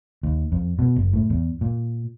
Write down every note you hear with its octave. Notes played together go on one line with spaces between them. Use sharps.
D#2
F2
B2
F#1
A2
E2
A#2